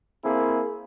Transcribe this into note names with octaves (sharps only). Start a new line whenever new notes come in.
A#3 C4 E4 G#4